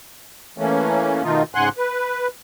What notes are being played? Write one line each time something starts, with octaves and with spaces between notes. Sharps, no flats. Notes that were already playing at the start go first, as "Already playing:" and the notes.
E3 A3 A#3 C#4
B2 D#3 A3 D#4 F4
G#2 C#3 F#5 G#5 C6 F#6
B4